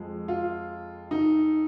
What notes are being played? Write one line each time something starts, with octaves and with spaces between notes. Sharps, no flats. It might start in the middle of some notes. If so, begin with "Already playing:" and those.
Already playing: F2 F3 G#3
F4
D#4